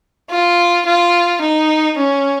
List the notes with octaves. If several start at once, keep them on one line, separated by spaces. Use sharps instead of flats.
F4
F4
D#4
C#4